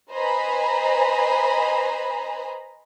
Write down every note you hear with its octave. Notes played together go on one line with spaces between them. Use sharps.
B4 C5 D#5 G#5 A#5 B5